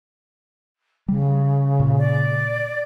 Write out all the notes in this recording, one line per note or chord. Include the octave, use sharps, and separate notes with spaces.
C#3 G3
A#2
D5